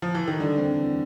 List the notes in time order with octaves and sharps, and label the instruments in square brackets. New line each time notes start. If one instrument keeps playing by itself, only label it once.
[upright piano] F3
E3
D#3
[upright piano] D3 [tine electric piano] G3
[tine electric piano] C4
E3